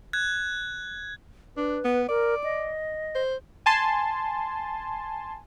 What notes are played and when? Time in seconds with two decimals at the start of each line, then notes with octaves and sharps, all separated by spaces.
0.13 F#6 G#6
1.57 D4 B4
1.84 B3
2.08 A#4 D5
2.44 D#5
3.15 C5
3.66 G#5 A5 C6